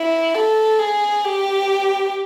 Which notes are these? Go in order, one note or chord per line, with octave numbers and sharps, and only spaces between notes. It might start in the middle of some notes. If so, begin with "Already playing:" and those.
Already playing: E4
A4
G#4
G4